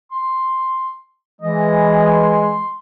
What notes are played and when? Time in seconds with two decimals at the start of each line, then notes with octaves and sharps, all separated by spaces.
0.11 C6
1.41 E3 G#3 D#5
2.07 C6